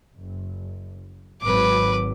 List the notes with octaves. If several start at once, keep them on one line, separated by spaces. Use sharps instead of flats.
F#1
G#1 F#3 B4 D6